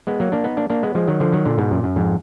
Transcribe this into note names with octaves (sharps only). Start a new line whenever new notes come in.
G#3 B3
F#3 A#3
A#3 D4
B3 D#4
A#3 D4
A#3 D4
G#3 B3
F3 G#3
D#3 F#3
D3 F3
D#3 F#3
A#2 D3
G#2 B2
F#2 A#2
F#2
F2 G#2